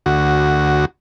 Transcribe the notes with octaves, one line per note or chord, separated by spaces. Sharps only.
D2 F#4